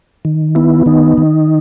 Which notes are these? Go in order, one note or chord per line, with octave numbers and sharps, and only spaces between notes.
D#3
B3 E4
D#3 D#4
D#3